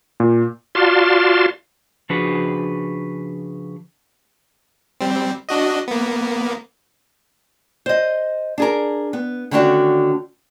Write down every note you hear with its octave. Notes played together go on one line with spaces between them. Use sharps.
A#2
F4 F#4 D5 F5 A5 C6
C#3 F3 D4 F#4 G#4 B4
G3 C4
D4 F#4 D#5
A#3 B3
C5 D#5
D4 G#4 A#4
B3
D3 D#3 A3 C#4 D4 F#4